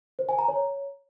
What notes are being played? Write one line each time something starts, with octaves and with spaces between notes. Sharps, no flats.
C5
G#5
A#5
C#5